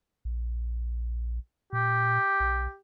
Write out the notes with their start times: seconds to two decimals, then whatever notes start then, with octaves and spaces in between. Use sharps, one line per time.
0.25 A#1
1.73 A#2 G4
2.40 B1